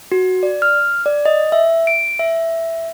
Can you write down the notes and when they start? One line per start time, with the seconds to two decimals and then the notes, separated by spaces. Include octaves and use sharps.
0.12 F#4
0.43 D5
0.62 F6
1.06 D5
1.25 D#5
1.52 E5
1.87 D7
2.19 E5